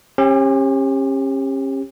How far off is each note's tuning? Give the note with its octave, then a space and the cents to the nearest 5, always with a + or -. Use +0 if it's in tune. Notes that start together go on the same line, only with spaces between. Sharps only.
C#4 -35 G4 +25